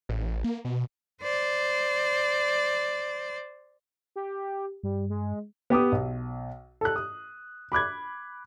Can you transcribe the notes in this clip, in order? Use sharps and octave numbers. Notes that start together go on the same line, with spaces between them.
A1
A#3
B2
C5 D5
G4
G2 G3
G#3
B3 G4 D6 D#6
B1
A4 F#6
D#6
B5 D6 F#6 G#6